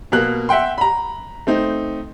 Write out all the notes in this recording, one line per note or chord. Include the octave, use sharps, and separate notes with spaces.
B2 A#3 F#6
E5 F#5 G5 C6
A#5 B5
A3 C4 D#4